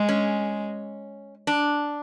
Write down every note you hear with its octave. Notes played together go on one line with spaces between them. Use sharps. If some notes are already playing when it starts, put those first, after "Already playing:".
Already playing: G#3
C#4
D4